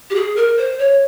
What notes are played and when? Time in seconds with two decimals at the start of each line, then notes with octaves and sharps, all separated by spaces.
0.10 G4
0.15 G#4
0.36 A#4
0.57 C5
0.79 C#5